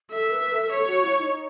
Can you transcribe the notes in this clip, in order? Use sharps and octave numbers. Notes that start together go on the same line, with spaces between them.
A4 E5
B4
A4
A4 C#5
F#4
E4
D#4